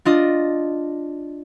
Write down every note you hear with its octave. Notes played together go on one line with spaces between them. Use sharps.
D4 F4 D#5